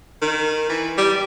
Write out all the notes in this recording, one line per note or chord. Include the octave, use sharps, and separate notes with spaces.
D#3
E3
G3